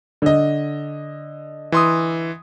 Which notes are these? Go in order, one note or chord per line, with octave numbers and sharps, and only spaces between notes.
D3 D#5
E3 C6 D#6